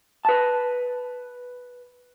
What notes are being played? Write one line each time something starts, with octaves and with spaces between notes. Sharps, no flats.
B4 A5